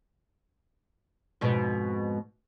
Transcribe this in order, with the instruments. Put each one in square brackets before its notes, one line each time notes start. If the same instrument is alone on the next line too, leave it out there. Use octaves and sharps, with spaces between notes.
[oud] F2 G#2 B2